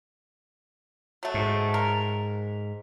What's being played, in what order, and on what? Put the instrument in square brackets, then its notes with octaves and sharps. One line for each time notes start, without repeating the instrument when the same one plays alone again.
[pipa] F#3 A3
[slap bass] G#2
[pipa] A#4